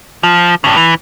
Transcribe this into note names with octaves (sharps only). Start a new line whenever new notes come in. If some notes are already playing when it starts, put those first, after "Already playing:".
F3
G2 C#3
E3